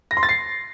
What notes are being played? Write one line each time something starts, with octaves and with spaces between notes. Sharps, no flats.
A#6
C6
A6
C7